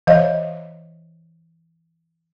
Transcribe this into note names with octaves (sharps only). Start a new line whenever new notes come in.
E3 C5 C#5 D#5 F5